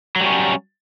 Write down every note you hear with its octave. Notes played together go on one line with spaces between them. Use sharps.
F#3 G3 C#4